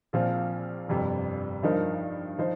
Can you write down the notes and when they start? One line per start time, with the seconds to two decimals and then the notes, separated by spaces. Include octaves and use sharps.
0.13 A#1 A#2 F3 C4 F4
0.88 G1 F2 C3 G3
1.63 G2 F3 D#4 A#4
2.38 F3 D#4 C5